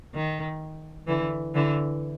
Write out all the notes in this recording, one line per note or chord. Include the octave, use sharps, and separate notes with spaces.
D#3
D3 E3
D3 E3